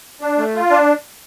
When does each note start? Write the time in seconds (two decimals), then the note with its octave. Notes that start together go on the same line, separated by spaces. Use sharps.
0.21 D4
0.38 A3
0.55 F4
0.70 D4